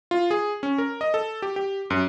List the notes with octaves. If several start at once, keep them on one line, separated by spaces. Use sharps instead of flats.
F4
G#4
C#4
A#4
D#5
A4
G4
G4
F#2